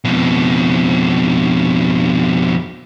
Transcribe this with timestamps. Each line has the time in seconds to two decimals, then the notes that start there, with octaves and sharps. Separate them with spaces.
0.05 F2 B2